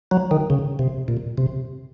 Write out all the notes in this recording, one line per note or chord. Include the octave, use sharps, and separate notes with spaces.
F#3
D#3
C#3
C3
A#2
C3